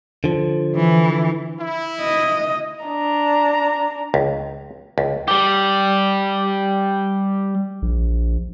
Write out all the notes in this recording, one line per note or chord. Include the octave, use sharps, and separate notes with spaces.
D3 F3
E3
E4
D#5
D4 A#5
C#2
C#2
G3 G4
A#1